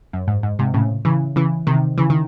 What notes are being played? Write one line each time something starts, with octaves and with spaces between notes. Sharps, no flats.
F#2
G#2
G#2
G#2 C3
A2 C#3
C#3 E3
C#3 E3
C3 D#3
C#3 E3
D#3